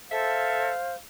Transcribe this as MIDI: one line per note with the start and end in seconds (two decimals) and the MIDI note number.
0.11 0.70 69
0.11 0.96 72
0.11 0.70 76
0.11 0.98 77